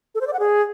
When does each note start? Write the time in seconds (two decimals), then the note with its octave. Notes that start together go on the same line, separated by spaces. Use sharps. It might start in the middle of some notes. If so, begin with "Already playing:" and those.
0.15 A4
0.21 C5
0.27 D5
0.33 F#5
0.39 G#4